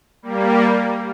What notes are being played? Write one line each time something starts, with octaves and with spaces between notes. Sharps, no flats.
G3 A#3